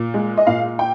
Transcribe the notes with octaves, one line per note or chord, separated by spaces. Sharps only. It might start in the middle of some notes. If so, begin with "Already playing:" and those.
Already playing: A#2
G#3
D#5
A#2 F5
G5